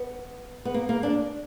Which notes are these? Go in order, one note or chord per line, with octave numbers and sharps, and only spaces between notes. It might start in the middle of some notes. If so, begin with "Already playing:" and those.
Already playing: B3
B3
A#3
A#3
D4